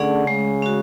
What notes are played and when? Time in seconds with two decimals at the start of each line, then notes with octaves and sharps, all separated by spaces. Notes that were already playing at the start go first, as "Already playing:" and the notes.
Already playing: D3 A3 C#4 G#4 D5 F#5
0.27 C#3 G#3
0.62 C#4 F#4